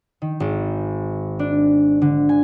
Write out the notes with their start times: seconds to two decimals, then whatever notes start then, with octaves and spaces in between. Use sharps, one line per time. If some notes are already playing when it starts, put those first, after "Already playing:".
0.22 D#3
0.40 G#1
1.39 D4
2.02 D3
2.29 G#5